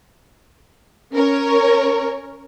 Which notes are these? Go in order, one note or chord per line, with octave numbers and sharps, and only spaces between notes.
C#4 A#4 C#5